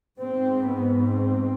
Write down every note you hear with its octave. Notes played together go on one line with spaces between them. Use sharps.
G#2 C4
B3
C4